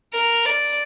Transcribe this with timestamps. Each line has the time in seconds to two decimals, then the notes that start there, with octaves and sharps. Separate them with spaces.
0.13 A#4
0.45 D5